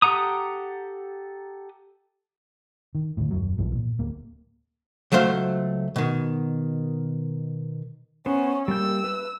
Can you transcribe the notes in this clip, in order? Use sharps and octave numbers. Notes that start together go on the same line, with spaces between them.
G4 A4 F#5 A#5 D#6
D#3
D1 D2 A2
D#1 F#2 F#3
B1 G2 E3 F3
A#2
D1 A#3
C#2 F#3 A3 C5 F5
B2 D#3
B3 C#4 C5
G3 A#3 E6 G6
B4